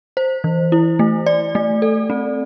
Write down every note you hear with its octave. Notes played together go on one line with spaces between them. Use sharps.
C5
E3
E4
A3
D5
A3
A4
C4